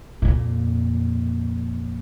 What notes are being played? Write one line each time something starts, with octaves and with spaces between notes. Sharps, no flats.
F2 A#2